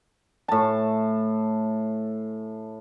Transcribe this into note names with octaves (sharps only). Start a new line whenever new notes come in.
A2 A5